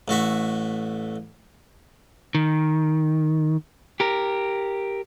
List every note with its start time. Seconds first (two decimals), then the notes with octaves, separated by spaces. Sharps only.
0.08 A1 A3 F#4 E5
2.35 D#3
4.00 G4 A#4